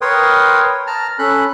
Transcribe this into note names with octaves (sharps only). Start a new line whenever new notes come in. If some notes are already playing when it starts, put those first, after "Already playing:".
A#4 B4 C#5 G5 C6 D#6
A5 A#5 F6
C#4 A4 B5 F#6